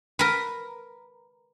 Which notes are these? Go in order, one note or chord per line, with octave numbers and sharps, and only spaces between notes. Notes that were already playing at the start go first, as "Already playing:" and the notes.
A#4 B4